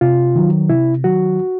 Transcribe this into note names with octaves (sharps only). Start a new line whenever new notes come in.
C3 F4
D#3 F#3
C3 E4
D#3 F#3 F#4